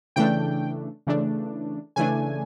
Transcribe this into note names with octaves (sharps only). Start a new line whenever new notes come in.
C#3 E3 A3 D4 G5
C#3 E3 A3 D4
C#3 E3 A3 D4 G#5